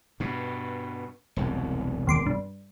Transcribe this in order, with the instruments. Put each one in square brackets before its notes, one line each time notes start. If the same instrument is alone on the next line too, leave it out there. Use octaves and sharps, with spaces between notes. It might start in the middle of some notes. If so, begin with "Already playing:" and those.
[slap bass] G2 B2
E1 C2 F#2
[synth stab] D#2 C6 D6
G2